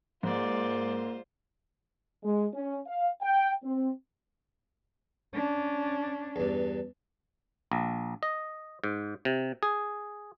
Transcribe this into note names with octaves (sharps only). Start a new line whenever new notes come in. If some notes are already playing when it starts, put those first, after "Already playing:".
G#2 A#3 F4 G#4 C5 D5
G#3
C#4
F5
G5
C4
C#4 D4
E2 G2
A#1
D#5
G#2
C3
G#4